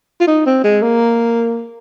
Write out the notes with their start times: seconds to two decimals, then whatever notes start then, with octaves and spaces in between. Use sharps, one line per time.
0.21 F4
0.27 D#4
0.46 C4
0.64 G#3
0.82 A#3